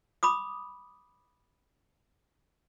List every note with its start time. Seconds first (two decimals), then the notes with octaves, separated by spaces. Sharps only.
0.23 B5 D6 D#6